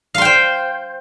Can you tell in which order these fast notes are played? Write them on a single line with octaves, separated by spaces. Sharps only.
F5 C6 G5 C5